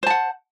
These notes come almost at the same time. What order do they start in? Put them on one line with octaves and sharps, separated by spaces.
C5 A5 F#5